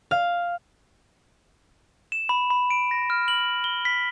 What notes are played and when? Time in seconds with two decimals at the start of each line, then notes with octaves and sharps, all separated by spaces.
0.11 F5
2.12 E7
2.29 B5
2.50 B5
2.70 D7
2.91 A#6
3.10 F6
3.28 F#7
3.64 G7
3.85 B6